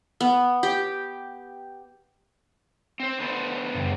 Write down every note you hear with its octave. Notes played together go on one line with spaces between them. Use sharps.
B3
G4
C4 C5
D3 B3 C5
F#2 C#3 G3